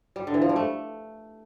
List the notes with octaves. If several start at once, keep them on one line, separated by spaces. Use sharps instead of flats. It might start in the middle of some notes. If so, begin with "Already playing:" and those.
G3
D3
E3
F3
G3
A3